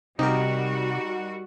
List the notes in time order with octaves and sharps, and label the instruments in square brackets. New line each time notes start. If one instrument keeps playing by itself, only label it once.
[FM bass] C3 [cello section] G3 F#4 [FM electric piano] D#4 G4 A#4